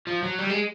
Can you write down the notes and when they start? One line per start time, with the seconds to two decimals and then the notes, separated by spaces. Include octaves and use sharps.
0.07 F3
0.23 F#3
0.39 G3
0.50 G#3